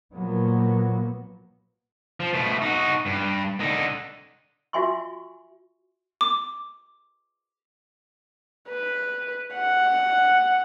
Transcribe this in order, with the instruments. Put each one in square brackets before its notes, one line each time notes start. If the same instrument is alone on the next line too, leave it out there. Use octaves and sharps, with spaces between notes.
[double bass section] A#2 F3 F#3 A#3 B3
[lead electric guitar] F3
B2 A3
D#4 F#4
G2
D3 D#4
[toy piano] F4 F#4 E5 G#5 C6 C#6
[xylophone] D6
[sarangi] B4
F#5